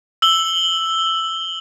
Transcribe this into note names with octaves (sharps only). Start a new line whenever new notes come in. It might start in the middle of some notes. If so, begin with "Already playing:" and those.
E6 F#7 G7